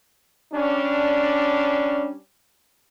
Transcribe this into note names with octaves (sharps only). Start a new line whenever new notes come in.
G3 C#4 D4